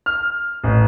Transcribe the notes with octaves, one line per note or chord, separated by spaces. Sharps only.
F6
A1